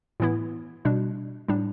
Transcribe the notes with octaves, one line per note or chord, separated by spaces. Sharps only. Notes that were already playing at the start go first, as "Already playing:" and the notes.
A2 E3 B3 E4
B2 G3 D4
A2 G3 D4